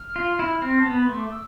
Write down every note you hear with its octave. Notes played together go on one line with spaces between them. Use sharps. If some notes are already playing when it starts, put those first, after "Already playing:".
Already playing: F6
F4
E4
C4
A5
B3
B5
A3 C6
D6
E6